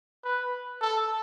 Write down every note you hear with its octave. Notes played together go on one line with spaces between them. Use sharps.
B4
A4